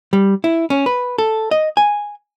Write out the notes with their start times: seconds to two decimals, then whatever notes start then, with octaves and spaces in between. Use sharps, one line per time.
0.13 G3
0.44 E4
0.70 C#4
0.86 B4
1.18 A4
1.51 D#5
1.77 G#5